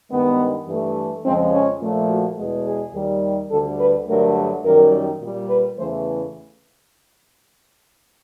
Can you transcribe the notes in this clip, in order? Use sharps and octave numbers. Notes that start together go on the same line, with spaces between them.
G2 D#3 G#3 B3
G2 E3 A3
F2 C#3 F3 G#3 C4
C#4
A#2 F3 A3
F#4
E2 B2 G#3
G#4
D#2 D#3 G3
D2 D3 G3 A4
B4
G2 D3 F#3 A3 A#4
F#2 D#3 G3 A#4
A#2 G3
B4
E2 C#3 E3 A3 C5